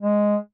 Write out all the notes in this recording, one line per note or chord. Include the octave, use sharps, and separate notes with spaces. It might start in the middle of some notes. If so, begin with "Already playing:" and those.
G#3